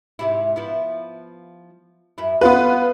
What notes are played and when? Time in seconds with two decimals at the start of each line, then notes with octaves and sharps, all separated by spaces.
0.19 G#2 C3 E4
0.56 F3 B3 E4
2.18 F#2 E4
2.41 G3 B3 F4 B4